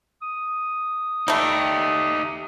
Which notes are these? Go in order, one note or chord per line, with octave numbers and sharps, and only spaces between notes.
D#6
G3 A3 D#4 G4